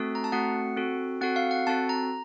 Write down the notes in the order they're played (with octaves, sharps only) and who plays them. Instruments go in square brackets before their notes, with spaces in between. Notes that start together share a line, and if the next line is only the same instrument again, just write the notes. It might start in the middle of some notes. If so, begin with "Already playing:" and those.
Already playing: [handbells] A3 C4 F#4 A4
A#5
A5
A3 C4 F#4 A4 F#5
C4 F#4 A4
C4 F#4 A4 F#5
F5
F#5
C4 F#4 A4 A5
A#5